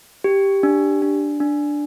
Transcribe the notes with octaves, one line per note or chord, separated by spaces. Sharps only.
G4
D4
D4
D4